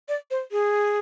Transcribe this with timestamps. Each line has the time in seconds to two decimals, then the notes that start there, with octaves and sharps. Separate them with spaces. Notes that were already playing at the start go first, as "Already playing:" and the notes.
0.09 D5
0.31 C5
0.52 G#4